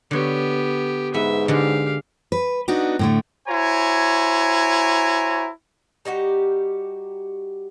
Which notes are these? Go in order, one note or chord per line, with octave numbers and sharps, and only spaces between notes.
D3 B3 G4 C#5
G#2 B3 E5
D3 G#3 G4 F5
B4
B3 D4 D#4 F#4
A2 D3 A3
E4 F#4 C5 C#5 G#5 A#5
G3 D#4 F#4 G4